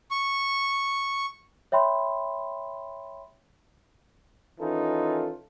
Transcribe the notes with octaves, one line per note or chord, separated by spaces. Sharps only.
C#6
C#5 E5 G5 B5 C6
D#3 E3 C#4 D#4 F4 A4